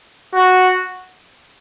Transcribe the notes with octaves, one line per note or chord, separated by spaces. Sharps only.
F#4